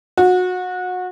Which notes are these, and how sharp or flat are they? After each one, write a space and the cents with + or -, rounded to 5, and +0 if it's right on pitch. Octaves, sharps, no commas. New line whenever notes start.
F#4 -25